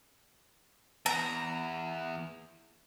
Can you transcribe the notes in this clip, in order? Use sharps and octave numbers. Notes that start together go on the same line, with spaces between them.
E2 A#5